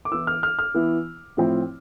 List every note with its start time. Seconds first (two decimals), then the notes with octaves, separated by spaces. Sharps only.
0.05 D6
0.11 E3 B3 E4 E6
0.27 F6
0.43 F6
0.59 F6
0.74 E3 B3 E4
1.37 A2 F3 C4 E4